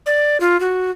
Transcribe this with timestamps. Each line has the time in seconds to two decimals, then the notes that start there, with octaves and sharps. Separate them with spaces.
0.06 D5
0.40 F4
0.60 F#4